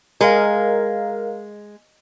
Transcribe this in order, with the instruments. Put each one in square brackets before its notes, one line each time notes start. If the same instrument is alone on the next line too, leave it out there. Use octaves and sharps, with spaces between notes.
[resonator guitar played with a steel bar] G#3 [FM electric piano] A#4 F5